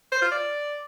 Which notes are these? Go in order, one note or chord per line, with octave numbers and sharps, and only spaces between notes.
C5
F4
D5